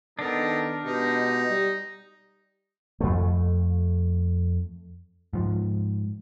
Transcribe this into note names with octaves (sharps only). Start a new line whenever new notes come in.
D#3 B3 D4 D#4 A4 A#4
B2 E3 G#3 D#4 G4
G3
F2 A3
G#2 F3